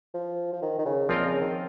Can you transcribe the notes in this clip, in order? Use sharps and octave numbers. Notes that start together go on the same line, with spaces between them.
F3
F3
D#3
D#3
C#3
A#2 F3 C4 F4 A#4 D#5
C#3
D#3